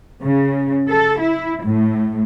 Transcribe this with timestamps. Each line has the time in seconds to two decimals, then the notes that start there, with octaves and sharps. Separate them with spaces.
0.23 C#3
0.90 A4
1.19 E4
1.64 A2